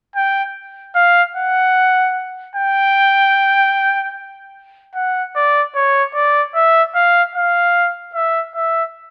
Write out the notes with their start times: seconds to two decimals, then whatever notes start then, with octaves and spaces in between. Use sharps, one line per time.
0.16 G5
0.95 F5
1.35 F#5
2.55 G5
4.95 F#5
5.36 D5
5.76 C#5
6.15 D5
6.55 E5
6.95 F5
7.35 F5
8.15 E5
8.56 E5